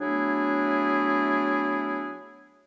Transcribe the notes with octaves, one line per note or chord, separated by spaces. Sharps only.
F#3 A3 B3 D4 E4 G#4